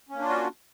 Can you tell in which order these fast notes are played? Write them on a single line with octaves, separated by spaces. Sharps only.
C#4 A#3 D4 F4 F#4